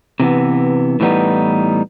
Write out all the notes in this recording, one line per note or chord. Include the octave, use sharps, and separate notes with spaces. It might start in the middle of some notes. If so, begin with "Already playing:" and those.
C3 E3 B3
A2 E3 G3 B3 D#4